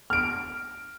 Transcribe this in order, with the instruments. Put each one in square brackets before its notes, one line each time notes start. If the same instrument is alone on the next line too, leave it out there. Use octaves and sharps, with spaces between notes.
[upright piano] F6 D7